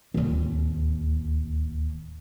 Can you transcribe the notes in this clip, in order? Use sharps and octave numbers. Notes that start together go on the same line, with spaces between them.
D1 D#2